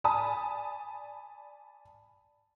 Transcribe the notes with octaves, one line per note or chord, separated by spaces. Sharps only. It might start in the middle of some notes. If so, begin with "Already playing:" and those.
D5 G#5 A5 B5 D#6